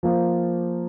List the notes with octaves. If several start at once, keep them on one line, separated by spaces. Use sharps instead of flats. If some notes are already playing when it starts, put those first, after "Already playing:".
F3 A#3 F4 C5